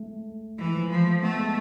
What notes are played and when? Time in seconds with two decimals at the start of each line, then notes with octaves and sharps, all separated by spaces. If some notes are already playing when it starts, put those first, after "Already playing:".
Already playing: G#3 A3
0.58 E3 G#3
0.74 F3
0.90 F3 G#3
1.07 A3
1.22 A3 B3
1.39 G#3